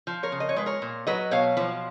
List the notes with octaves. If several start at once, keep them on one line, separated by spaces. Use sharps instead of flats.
F3
A#4 C#5
C#3
D#5
C#5
G#3 B4
A#4 C#5
A#2
F#3 B4 D#5
B2 C#5 F5
F3